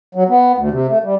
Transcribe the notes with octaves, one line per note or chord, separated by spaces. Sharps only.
F#3
B3
D2
C3
A3
G3